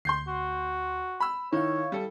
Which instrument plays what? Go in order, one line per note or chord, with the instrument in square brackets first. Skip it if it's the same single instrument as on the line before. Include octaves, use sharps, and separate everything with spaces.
[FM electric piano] D2 [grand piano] C6 G6 C7
[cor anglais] F#4
[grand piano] B5 E6
[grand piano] D#3 [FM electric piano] E4 F5 [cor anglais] C#5
[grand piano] G3 A4